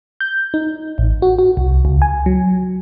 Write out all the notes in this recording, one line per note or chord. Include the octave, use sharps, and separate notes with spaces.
G6
D#4
A1
F#4
F#4
C2
C#2
G#5
F#3